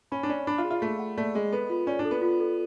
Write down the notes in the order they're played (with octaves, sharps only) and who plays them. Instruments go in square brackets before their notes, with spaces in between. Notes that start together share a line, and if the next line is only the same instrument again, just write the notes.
[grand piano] C#4 [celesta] B5
[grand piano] D4
[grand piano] C#4 [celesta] D5
[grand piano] D4 [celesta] B5
[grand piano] F4
[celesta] G#4
[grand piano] F4
[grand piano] A3 [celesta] G#4
[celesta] F#5
[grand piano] A3 [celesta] D5
[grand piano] G#3 [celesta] G#4
[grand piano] B3 [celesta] A4
[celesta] F4
[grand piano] C#4 [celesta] D5
[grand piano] D4
[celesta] A4
[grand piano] B3
[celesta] F4
A4